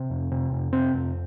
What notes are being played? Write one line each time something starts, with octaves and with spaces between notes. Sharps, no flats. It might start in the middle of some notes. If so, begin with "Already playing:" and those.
Already playing: C3
F2
C3
F2
C3 C4
F2